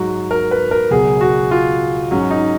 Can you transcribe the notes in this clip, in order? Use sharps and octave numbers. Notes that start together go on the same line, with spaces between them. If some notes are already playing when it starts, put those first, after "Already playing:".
Already playing: G#2 F#3 F#4
A#4
B4
A#4
C#2 B2 F#3 G#4
F#4
F4
G#2 F#3 C#4
D#4